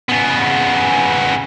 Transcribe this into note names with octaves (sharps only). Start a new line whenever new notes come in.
C#3 B3